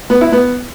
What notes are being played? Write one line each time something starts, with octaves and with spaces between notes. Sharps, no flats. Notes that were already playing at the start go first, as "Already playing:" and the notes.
B3
E4
B3